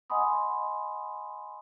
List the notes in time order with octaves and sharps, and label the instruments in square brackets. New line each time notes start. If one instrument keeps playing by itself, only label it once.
[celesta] D#5 F#5 G#5 B5 C6 D#6